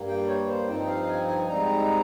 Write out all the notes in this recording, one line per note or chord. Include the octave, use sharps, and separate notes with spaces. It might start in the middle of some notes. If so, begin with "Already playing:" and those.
Already playing: G2 G3 A#3
G5
C#5
C5
G2 F3 C4 D#4 G5
F5
G#5
G#5
G#2 G3 C4 D#4 A#5